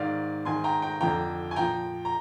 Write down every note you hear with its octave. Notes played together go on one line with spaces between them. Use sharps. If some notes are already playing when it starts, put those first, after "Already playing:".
Already playing: G#2 D#3 D5 F5
G#2 D#3 G#5 C6
G5 A#5
G5 A#5
F2 D3 F3 G5 A#5
G#5
A#2 F3 G5 A#5
A#5